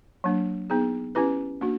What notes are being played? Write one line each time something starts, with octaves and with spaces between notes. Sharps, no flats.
F#3 A#3 D4
B3 D#4 G#4
C#4 E4 G4 B4
A#3 D4 F#4